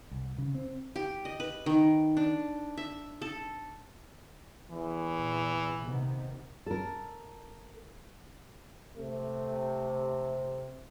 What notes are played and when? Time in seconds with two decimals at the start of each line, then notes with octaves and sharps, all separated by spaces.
0.11 C2
0.38 C#3
0.55 C4
0.96 G4
1.25 D#5
1.40 B4
1.66 D#3
2.17 D4
2.77 E5
3.22 A4
4.72 E2 E3
5.13 A#2
5.82 C3 D#3 B3
6.66 A4 A#4
8.97 C3 A3